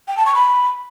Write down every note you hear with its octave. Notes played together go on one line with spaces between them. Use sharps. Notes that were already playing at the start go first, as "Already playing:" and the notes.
G5
A5
C#6
B5